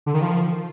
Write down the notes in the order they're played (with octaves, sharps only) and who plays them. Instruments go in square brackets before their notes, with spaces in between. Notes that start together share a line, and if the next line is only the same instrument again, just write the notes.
[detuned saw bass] D3
D#3
F3